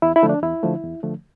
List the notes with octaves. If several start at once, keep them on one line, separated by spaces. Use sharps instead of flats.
E2 E4
E4
D3 F3 A3
D4
E2 E4
D3 F3 A3
E2
D3 F3 A3